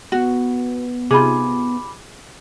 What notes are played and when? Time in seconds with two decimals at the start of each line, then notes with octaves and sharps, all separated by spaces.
0.12 B3 F#4
1.11 C3 D#4 F4 G#4 B5 D6